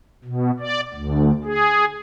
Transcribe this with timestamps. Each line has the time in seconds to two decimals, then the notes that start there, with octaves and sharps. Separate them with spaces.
0.24 B2
0.59 D5
0.94 D2
1.44 G#4